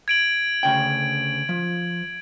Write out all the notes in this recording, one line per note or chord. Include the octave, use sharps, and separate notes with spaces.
G#6 D7 F#7
D2 C#3 G5
F3